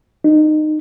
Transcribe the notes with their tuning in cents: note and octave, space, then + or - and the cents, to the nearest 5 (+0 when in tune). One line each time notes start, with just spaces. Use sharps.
D#4 -20